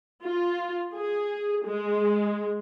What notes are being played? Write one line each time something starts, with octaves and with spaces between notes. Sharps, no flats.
F4
G#4
G#3